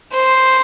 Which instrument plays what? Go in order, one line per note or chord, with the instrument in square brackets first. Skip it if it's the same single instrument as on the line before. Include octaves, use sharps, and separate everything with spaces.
[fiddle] C5